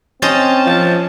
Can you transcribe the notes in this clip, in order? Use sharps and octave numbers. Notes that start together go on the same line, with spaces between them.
C4 C#4 C5 D#5 A5
F3